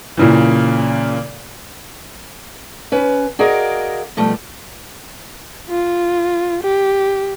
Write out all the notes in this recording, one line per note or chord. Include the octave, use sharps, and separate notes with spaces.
A#2 C#3 E3
C#4 B4
F#4 G#4 A#4 D5 D#5 F5
B2 F3 G3 A3
F4
G4